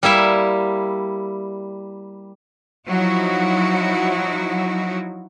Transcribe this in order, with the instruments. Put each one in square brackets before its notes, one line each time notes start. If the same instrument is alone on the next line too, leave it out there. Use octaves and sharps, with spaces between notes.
[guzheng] G3 A#3 E4 E5
[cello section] F3 F#3 D#4 E4 F#4